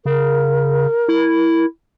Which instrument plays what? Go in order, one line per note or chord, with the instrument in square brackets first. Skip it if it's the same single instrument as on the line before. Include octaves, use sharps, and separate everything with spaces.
[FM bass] C#3 [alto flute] A#4
[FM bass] E4